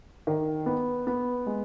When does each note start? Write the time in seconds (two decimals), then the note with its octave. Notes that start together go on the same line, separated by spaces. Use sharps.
0.27 D#3
0.66 B3
1.07 B3
1.47 G#3